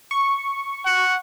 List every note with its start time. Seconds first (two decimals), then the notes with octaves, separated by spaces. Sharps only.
0.11 C#6
0.86 F#5